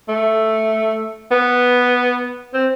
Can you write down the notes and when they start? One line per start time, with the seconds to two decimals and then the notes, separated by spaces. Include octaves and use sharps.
0.09 A3
1.31 B3
2.54 C4